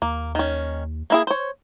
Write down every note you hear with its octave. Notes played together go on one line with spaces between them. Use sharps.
D#2 A#3
D#3 C#4
A#3 E4 G#4
C5 C#5